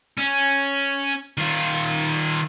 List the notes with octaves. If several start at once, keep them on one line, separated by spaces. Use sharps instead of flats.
C#4
D#3 F4